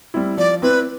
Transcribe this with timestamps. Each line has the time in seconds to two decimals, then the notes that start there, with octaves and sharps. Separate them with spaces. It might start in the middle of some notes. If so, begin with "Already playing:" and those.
0.14 G3 C4 E4
0.37 F3 D5
0.62 C4 E4 B4